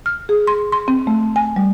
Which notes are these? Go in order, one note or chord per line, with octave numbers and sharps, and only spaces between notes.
F6
G#4
C6
C6
C4
A3
G#5
G3